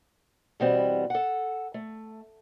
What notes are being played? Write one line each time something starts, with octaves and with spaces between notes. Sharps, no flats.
B2 E3 G3 B3 C4
A4 F#5
A3